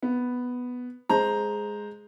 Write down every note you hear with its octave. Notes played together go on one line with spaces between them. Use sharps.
B3
G#3 C5 A#5